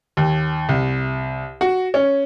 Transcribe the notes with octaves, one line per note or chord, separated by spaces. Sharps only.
D#2
C2
F#4
C#4